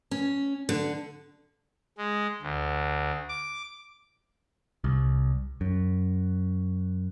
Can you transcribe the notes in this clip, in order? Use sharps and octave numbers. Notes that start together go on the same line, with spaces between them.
C#4
D3
G#3
D2
D6
C2
F#2